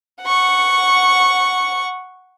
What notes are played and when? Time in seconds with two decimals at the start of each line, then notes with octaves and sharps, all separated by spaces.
0.23 F#5 C#6